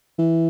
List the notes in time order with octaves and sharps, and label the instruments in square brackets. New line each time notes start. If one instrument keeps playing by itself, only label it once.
[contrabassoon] E3